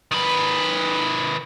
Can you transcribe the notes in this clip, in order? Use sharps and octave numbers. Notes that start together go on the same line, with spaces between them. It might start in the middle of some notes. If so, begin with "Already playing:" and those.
D#3 B4